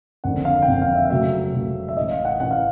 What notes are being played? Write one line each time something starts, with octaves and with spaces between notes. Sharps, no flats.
F#1 F2 D3 F#5
F5
G5
F#1 F2 D3 F#5
F5
E5
F5
C#2 C#3 F#3 A3 E5
C#2 C#3 F#3 A3
E5
A1 A2 E3 D#5
F5
F#5
A1 A2 E3 F#5
F5